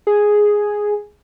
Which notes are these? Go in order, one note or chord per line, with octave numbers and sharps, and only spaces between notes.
G#4